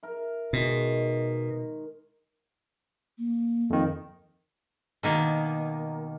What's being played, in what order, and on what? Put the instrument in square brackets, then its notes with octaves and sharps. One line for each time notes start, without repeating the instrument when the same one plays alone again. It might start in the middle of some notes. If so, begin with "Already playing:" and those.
[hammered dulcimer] A#4 E5
[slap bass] B2 [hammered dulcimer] D#3 G#3
[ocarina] A#3
[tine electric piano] F2 D#3
[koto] B2 D#3 A#3